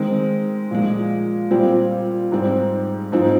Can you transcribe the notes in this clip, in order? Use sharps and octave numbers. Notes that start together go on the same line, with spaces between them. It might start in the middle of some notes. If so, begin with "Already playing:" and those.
Already playing: D#3 G#3 C4
A#2 F3 G#3
A#2 G3 C4 F4
G#2 G3 C4
G#2 F3 C4 D#4